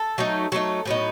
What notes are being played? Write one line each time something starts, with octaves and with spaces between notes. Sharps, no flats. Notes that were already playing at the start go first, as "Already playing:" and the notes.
Already playing: A4
F#3 A3 D#4
F#3 A3 D#4 A4
A2 F#3 B3 D#4